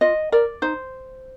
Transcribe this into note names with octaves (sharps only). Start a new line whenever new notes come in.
F4 D#5
A#4 D5
D#4 C5